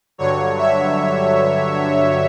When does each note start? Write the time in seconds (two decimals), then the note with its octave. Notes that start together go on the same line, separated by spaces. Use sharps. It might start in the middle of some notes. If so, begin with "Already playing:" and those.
0.18 G2 D3 F#3 C#5
0.58 E5